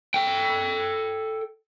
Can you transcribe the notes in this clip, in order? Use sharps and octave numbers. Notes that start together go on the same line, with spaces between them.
A4 G5